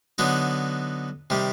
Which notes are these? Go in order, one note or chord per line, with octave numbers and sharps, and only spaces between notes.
D3 F#3 B3 D#4 F#4
C3 D#3 G3